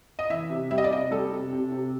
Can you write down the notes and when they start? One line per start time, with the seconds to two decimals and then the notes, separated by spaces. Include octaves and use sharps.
0.19 D#5
0.30 E3 E5
0.50 C3
0.71 G3 E5
0.78 D#5
0.84 D5
0.91 C3 D#5
1.11 G3 A4
1.32 C3
1.53 C3
1.72 C3